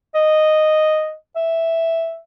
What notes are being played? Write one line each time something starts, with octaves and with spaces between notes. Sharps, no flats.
D#5
E5